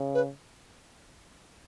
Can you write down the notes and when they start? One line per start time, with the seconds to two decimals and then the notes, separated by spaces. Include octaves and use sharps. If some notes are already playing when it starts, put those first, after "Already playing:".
Already playing: C#3
0.14 B4